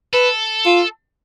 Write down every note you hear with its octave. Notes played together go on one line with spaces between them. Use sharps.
A4 B4
F4